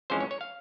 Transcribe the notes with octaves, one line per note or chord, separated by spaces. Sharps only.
F2 E3 G#3 C#4 C5
C#5
C#5
F5